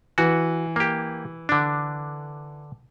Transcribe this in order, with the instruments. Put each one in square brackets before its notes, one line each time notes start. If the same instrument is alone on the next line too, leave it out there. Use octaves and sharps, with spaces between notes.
[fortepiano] E3 [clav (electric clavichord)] F#4
[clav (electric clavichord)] A#3 G4
D3 D4